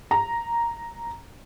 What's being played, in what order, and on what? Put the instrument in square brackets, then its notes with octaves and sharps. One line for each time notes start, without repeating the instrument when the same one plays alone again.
[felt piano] A#5